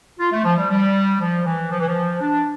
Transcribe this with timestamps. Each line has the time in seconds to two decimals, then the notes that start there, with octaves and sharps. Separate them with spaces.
0.20 F4
0.32 A3
0.44 F3
0.57 G3
0.70 G3
1.20 F3
1.45 E3
1.71 F3
1.80 E3
1.88 F3
2.21 D4